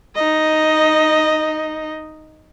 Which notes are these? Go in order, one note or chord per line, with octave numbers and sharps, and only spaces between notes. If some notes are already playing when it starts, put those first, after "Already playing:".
D#4 D#5